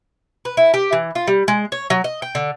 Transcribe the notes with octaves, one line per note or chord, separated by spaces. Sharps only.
B4
E4
G4
E3
F4
G3
G#3
C#5
F#3
D#5
G5
D3